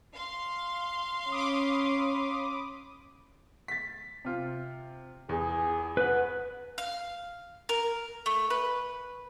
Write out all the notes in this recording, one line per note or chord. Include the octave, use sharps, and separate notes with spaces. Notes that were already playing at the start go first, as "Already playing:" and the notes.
F5 C6
C#4 B5 D6 D#6
A6 B6
C3 F4
E2 G#4
B4 F#5
F5
A#4
A3
B4